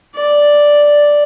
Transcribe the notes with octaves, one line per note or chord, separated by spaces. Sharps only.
D5